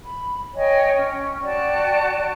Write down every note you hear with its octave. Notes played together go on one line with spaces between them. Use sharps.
B5
C#5 D#5 G5 G#5
C#4
F#4 D5 G5 A5